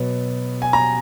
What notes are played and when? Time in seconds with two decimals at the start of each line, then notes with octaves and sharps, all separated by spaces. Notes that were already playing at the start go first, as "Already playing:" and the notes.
Already playing: B2 F#3 B3
0.62 G#5
0.73 A#5